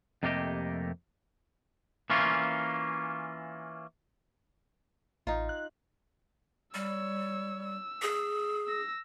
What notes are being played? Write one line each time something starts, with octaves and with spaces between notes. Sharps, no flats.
F2 C3 A3 A#3 G4 D#5
E3 A#3 C#4 F4
A1 D#4 F4
F#6
G3 C#5 E6
E6
G#4
E6 A#6